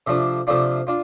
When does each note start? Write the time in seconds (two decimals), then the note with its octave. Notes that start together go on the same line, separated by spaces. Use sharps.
0.07 C3 F3 A3 D4 F4
0.47 C3 F3 A3 D4 F4
0.87 D4 F4